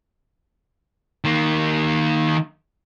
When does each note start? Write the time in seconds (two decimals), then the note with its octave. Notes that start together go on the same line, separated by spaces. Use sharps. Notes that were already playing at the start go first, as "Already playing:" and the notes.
1.24 D#3 A#3